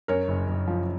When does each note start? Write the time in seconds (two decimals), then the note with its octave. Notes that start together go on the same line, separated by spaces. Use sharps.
0.08 F#2 A#4 C#5
0.28 F#1
0.49 F#1
0.67 F3